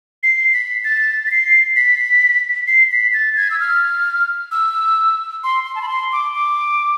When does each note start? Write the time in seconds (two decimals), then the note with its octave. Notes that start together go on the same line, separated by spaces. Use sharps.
0.23 C7
0.54 B6
0.84 A6
1.27 B6
1.31 C7
1.76 B6
2.67 C7
2.92 B6
3.14 A6
3.37 G#6
3.51 E6
3.60 F6
4.51 E6
5.44 C6
5.66 C6
5.75 A5
5.82 B5
5.89 C6
6.12 D6
6.35 D6